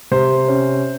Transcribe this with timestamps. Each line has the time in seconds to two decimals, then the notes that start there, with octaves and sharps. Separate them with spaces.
0.11 C3 C5
0.48 C#4